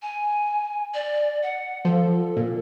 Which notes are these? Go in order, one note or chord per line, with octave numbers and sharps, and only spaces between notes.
G#5
D5
F#5
F3 A4
A#2